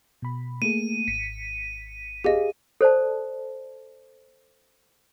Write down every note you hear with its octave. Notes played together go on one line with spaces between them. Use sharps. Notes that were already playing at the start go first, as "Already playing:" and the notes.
B2 B5
A3 A#3 G#4 D#7
G#1 B6 C#7
G4 G#4 D#5 F5
A4 C5 D5 A5